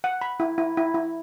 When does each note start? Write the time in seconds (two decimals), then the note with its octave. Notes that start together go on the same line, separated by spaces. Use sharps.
0.04 F#5
0.21 B5
0.40 E4
0.58 E4
0.77 E4
0.94 E4